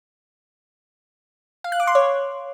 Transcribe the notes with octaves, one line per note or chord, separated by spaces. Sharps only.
F5
F#6
D6
C6
C#5